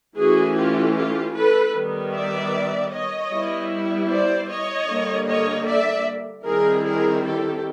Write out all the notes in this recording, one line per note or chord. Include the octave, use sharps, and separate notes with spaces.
E3 A3 C#4 E4 F#4 G#4
F4 G4
F4 G4
A4 B4
D#3 G3 B3
D5 E5
C#5 D#5
G3 B3 E4
C5 D5
C#5 D#5
D3 G3 A#3
C#5 D#5
D5 E5
D#3 G3 C4 E4 G#4 A#4
G#4 A#4
G4 A4